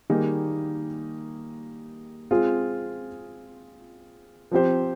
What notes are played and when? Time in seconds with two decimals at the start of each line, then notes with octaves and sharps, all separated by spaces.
0.10 D#3 G3 A#3 D#4 G#4
2.31 G#3 C4 F4 G#4
4.51 F3 C4 G4 C5